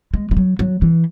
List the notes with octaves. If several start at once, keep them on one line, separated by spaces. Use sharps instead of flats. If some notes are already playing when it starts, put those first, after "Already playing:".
G#3
G#3
F#3
F#3
E3